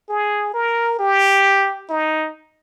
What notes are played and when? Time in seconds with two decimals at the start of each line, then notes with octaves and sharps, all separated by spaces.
0.09 G#4
0.54 A#4
0.99 G4
1.90 D#4